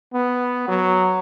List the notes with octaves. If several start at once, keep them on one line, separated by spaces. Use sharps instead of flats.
B3
F#3